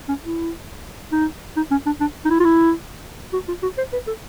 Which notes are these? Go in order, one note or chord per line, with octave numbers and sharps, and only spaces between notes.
C#4
E4
D#4
D#4
C#4
D4
D4
D#4
E4
F4
E4
F#4
F4
F#4
C5
B4
A4